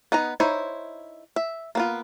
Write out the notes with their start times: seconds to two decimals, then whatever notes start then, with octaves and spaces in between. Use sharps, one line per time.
0.12 B3 D#4 F#5 A#5
0.40 D#4 E4 C5 C#5
1.36 E5
1.75 A#3 B3 F4